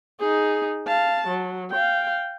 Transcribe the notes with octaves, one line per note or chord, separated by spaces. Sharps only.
D#4 G#4
F5 A5
F#3
F5 G5